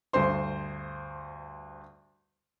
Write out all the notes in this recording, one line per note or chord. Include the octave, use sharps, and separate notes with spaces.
D2 G2 C5 C6